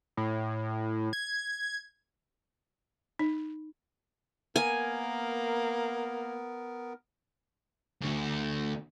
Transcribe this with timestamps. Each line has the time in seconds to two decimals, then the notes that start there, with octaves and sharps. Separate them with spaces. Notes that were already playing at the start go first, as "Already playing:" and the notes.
0.17 A2
1.13 G#6
3.19 D#4
4.56 A#3 B3 A#4 G#5
8.02 D2 D3